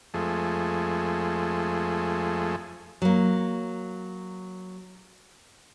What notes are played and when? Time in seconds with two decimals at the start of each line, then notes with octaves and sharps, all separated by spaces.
0.14 F2 G#3 A3
3.02 F#3 A#3